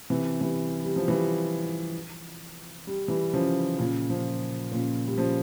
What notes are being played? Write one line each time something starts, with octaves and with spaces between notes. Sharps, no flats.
C3 E3
E3 G3
G3
F3
E3 G3
G3
E3 G3
C#3 F3
A#2 C#3
C#3 F3
A#2 C#3
G3
C#3 F3